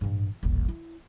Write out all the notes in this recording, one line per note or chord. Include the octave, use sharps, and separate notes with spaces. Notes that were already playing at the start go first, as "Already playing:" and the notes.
A1 G2
D#1 A1
E4